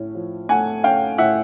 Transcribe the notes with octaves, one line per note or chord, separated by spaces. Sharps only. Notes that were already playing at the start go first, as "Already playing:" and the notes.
Already playing: A2 A3 C#4
F3
A3 F#5 G#5
C#4 F5 G5
A2 E5 F#5